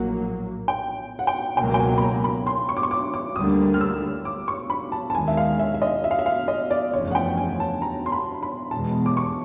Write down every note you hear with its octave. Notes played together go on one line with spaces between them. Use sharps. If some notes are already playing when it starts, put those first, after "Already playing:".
Already playing: A#1 A2 F#3 A#3 F#5
G5
F#5
G5
C#2 B2 F#3 A#3 G5
G5
G#5
B5
A#5
B5
C6
C#6
D6
C#6
D6
D6
D2 D3 G3 A#3 D#6
F6
E6
D6
C#6
B5
A5
A5
D#2 D#3 G#3 G#5
E5
F5
E5
E5
D#5
E5
F5
E5
F5
D#5
D5
F#1 E2 C#3 F3 A3 C#5
F#5
G5
G#5
A5
A#5
C6
B5
B5
E2 B2 G#3 A5
D6
C#6